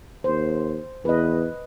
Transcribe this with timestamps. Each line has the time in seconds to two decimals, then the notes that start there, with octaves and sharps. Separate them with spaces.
0.24 D#2 C5
1.05 E2 B4 D#5